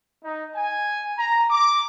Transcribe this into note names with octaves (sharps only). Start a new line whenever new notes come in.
D#4
G#5
A#5
D6